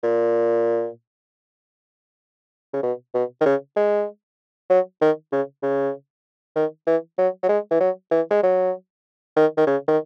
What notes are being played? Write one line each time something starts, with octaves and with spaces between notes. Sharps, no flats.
A#2
C#3
B2
B2
D#3
C#3
G#3
F#3
D#3
C#3
C#3
D#3
E3
F#3
F#3
G#3
E3
F#3
E3
G#3
F#3
D#3
D#3
C#3
D#3